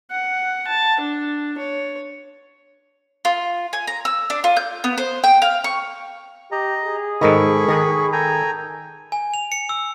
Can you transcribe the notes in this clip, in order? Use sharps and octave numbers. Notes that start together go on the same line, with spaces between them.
F#5
A5
D4
C#5
F4
G#5
A#5
E6
D4
F4
G6
B3
C5
G5
F5
C#6
G4 D#5 A#5
G#4
G#2 D#3 A4 A#4 D#5 B5 C#6
D#3 A#4 D#6 F#6
A4 G5 G#5 A#5
G#5
F7
C#7
E6